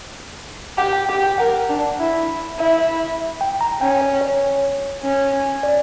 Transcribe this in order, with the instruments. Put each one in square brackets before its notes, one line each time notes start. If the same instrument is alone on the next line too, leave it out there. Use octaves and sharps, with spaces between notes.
[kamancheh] G4 [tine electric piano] F#5
[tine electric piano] G5
[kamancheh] G4 [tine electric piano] G5
[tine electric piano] G5
[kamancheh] A#4 [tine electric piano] F#5
[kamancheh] D4
E4
[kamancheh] E4 [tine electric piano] E5
[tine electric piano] G5
A#5
[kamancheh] C#4 [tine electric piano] G5
[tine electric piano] C#5
C#5
[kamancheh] C#4
[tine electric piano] D5